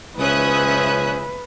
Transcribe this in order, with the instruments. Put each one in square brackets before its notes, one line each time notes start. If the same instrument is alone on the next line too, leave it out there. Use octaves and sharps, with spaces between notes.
[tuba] C#2 [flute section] C#4 C5 [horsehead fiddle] B4 [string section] E5 D#6 F#6